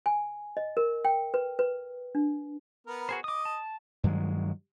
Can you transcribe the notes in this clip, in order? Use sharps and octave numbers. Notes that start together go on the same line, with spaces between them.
G#5
D#5
A#4
G5
B4
B4
D4
B3 A#4
F#4 G#4 C5
D#5 D6 D#6
A5
G2 D#3 F#3 G#3